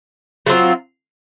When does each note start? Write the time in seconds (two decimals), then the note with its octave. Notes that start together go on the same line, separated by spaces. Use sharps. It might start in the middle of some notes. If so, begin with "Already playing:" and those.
0.46 F#3 A3 C4 F4